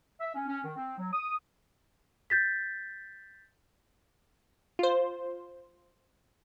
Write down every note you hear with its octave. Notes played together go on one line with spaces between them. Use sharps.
E5
C#4
C#4
D#3
C4
F#3
D#6
G6 A6 B6
F4 C5